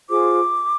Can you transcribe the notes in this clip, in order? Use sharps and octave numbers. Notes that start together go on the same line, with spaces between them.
F4 G#4 C5 D6